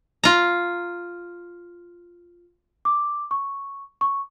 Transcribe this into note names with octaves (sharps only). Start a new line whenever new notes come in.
F4 A#5
D6
C#6
C#6